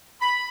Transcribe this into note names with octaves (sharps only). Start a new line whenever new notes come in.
B5